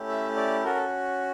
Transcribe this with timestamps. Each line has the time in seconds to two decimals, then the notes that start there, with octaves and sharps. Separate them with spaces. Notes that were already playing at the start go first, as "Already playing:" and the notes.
Already playing: A3 C#4 E4 G4
0.09 E5
0.37 D5
0.64 C#4 F#4 A4 A#4
0.75 A4